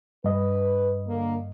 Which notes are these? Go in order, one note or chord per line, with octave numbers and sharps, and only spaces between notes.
G2 B4 D#5
D3 A#3